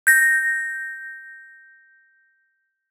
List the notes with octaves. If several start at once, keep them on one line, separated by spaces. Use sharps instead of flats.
G6 A#6